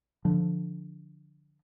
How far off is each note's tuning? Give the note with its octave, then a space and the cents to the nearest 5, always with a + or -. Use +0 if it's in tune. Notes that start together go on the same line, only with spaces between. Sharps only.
D3 +0 F3 +0